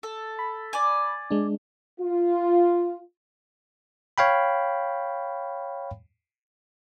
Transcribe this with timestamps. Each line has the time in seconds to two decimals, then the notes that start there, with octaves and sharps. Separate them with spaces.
0.03 A4
0.39 B5
0.73 D5 G#5
1.31 G#3 D4
2.01 F4
4.18 C#5 F5 G5 B5